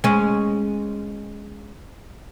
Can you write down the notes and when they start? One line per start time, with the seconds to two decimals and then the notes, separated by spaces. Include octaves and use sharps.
0.04 G#3 C#4